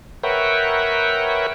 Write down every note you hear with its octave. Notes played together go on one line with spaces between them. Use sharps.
A#4 B4 C#5 E5 F#5 G5